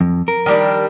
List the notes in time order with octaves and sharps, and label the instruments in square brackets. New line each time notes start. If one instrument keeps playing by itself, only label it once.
[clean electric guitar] F2
A#4
[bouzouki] D#3 G3 D4